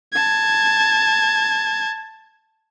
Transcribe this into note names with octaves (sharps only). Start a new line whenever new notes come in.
A5 G#6